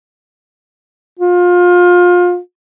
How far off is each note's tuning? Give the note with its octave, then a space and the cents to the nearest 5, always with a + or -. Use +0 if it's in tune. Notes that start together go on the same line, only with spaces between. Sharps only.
F4 +25